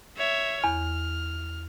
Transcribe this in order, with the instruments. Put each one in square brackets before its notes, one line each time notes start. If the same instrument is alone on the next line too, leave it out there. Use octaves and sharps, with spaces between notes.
[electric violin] C#5 E5
[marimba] E2 [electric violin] F6